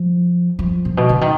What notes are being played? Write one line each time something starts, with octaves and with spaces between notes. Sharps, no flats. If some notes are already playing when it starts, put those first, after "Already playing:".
Already playing: F3
F3
A#2
B2
D3
D#3